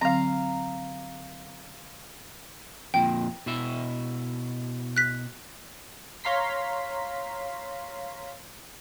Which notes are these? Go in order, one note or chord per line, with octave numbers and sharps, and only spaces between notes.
D3 F#3 C4 F5 A#5
F2 A#2 G5
B2 E4 E5
F#6 B6
C#5 F5 A#5 C6 B6